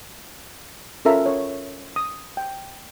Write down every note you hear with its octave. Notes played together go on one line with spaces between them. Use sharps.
C#4 F4 A4 A#4 E5 A#5
C#4 C#5
D#6
G5